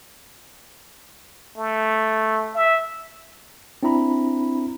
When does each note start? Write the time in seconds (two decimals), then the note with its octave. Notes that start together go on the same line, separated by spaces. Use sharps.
1.57 A3
2.55 E5
3.83 C4 D4 E4 A#5 B5